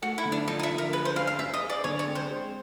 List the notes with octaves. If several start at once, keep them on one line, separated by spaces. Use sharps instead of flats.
A3 F#4
E4
D3
D4
F3 D#4
D#4
E4
D3
A#4
G#4 B4
C5
C#4 F5
F5
C#4 E5
D#5
G#4
D5
D3 C#5
C#5
C4
C5
G#3